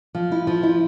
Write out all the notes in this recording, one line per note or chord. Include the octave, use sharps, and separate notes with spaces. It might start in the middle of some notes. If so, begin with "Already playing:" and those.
F3
E4
F3
E4